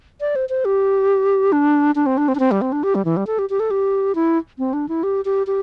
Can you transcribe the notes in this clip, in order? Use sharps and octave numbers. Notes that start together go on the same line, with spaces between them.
D5
C5
C5
G4
D4
D4
C4
D4
C4
D4
C4
G3
C4
D4
G4
G3
E3
G3
A4
G4
G4
A4
G4
E4
C4
D4
E4
G4
G4
G4